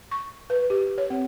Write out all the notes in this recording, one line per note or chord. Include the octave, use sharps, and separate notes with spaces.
C#6
B4
G4
C#5
C4